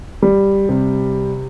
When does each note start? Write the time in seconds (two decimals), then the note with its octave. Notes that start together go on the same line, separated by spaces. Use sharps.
0.22 G3
0.69 C3